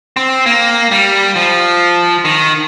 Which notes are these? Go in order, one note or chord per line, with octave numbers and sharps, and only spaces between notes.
C4
A#3
G3
F3
D#3